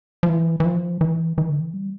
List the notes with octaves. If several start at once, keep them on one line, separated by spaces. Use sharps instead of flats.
F3
E3
E3
F3
E3
E3
D3
E3
G3